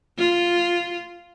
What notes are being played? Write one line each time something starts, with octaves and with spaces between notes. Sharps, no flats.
F4